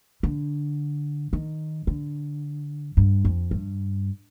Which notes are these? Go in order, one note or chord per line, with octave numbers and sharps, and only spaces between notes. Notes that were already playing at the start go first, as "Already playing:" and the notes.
D3
D#3
D3
G2
F2
G2